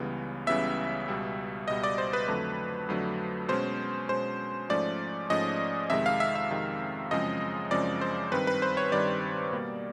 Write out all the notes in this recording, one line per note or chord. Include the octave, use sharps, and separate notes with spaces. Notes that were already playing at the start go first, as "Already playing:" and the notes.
Already playing: C#2 C#3 E3 G3 B3
C#2 C#3 E3 G3 B3 E5
C#2 B2 G3
C#2 B2 G3 D#5
D5
C5
B4
F2 D3 F#3 A3 D4 B4
F2 D3 F#3 A3 D4
B2 G#3 C#4 C5
B2 G#3 C#4 C5
G#2 F3 A3 C#4 D5
G#2 F3 A3 C#4 D#5
F2 C3 D#3 G#3 E5
F5
E5
E5
F2 C3 D#3 G#3
F#2 C#3 F3 G#3 C4 D#5
F#2 C#3 F3 G#3 C4 D5
C5
G2 D#3 G3 C4 B4
B4
C5
C#5
G2 D#3 G3 C4 D5
B2 G3 A#3